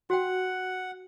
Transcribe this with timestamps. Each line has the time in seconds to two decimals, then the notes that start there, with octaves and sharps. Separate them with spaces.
0.10 F#4 F#5 G5